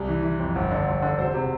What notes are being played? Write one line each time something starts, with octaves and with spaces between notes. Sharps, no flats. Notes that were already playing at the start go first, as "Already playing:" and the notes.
Already playing: C2 G3
E3
E3
F2
G1
D3
G1
D3
E1 C5
C3